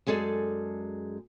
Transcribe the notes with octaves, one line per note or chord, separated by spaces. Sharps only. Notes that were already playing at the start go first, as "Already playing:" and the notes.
F#2 G#3 G#4 A4 D5